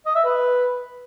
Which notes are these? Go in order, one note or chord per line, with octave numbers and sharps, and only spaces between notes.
D#5
E5
B4